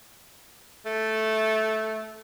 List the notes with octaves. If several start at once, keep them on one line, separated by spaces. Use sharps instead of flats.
A3